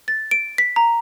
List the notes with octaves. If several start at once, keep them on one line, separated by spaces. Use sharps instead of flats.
A6
D7
B6
A#5